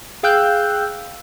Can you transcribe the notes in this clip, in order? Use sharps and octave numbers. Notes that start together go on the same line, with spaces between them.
G#4 F5 G5 E6 F#6 G6